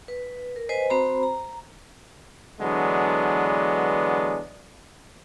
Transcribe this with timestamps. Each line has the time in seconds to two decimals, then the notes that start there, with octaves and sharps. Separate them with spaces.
0.08 B4
0.56 A#4
0.69 B4 C5 D#5 G#5
0.90 C4 F#4 C5 A#5 B5
1.23 A#5
2.61 D3 E3 F#3 G#3 B3 D4